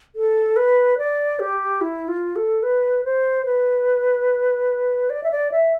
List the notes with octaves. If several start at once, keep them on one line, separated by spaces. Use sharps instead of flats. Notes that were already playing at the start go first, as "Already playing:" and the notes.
A4
B4
D5
G4
E4
F4
A4
B4
C5
B4
D5
E5
D5
E5